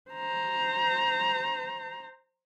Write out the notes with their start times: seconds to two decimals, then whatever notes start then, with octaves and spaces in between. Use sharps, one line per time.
0.11 C5 A#5